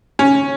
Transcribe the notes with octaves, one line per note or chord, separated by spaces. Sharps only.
C#4